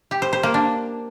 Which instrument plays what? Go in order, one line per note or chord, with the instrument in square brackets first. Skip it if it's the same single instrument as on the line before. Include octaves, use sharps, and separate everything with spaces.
[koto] G4
C5
C5
A#3
D4